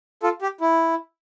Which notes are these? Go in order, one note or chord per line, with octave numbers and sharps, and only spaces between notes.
F4 A4
G4
E4